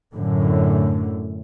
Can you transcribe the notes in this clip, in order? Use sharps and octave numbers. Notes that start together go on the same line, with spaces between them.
F#2 A2 D3